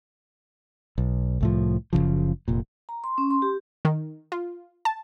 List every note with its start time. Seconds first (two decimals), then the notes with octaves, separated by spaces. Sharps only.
0.98 B1
1.41 C2 A2 F3
1.93 F#1 C#2 C#3 F3
2.48 F1 A#2
2.89 A#5
3.04 C6
3.18 C#4
3.30 C6
3.42 G4
3.85 D#3
4.32 F4
4.85 A5